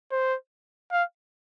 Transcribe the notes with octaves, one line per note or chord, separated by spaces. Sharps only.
C5
F5